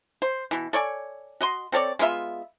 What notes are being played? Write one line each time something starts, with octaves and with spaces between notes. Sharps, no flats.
C5
B2 E3
A4 C#5 D5 G#5
F#4 D#5 C6
C4 A4 C#5 D5
G#3 B3 F4 E5